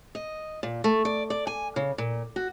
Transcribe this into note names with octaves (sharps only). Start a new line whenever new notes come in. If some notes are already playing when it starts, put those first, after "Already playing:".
D#5
A#2
A3
D5
D5
G#5
C#3
A#2
F#4